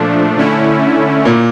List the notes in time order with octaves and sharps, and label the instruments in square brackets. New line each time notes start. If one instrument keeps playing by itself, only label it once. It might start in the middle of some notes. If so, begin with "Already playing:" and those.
Already playing: [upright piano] A#2 A#3 [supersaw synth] F3 A3 D4
[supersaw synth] D3 A3 C#4 E4
[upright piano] A#2 A#3